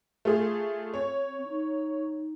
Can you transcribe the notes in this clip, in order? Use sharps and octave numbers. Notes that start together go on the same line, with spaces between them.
A3 F4 G#4
C4 C#5
D#4